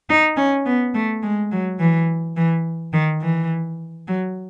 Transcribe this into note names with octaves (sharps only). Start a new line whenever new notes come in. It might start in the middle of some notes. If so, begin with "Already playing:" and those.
D#4
C#4
B3
A3
G#3
F#3
E3
E3
D#3
E3
F#3